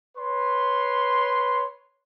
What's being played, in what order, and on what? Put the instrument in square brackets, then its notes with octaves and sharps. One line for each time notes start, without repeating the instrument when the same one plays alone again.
[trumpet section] B4 C#5 C6